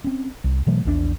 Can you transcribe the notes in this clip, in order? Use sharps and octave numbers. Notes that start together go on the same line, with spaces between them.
C4 C#4
C2
B2 E3 F#3 A3
A#1 E2 D3 D4